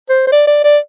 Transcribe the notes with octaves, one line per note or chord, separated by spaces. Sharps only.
C5
C5
D5
D5
D5